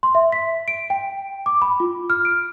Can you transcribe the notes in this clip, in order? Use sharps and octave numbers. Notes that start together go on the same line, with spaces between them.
C6
E5
B6
D7
G5
D6
B5
F4
F6
D7